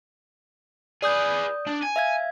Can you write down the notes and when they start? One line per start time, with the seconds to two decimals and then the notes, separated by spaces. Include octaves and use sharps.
1.03 G#4 B4 D5 D#6 G6
1.67 D4
1.83 G#5
1.96 E5 F5 G#6